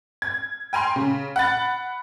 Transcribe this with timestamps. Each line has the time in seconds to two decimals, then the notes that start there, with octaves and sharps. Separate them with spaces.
0.22 G#6
0.73 G5 G#5 A#5 C6
0.96 C#3
1.36 F#5 B5 A6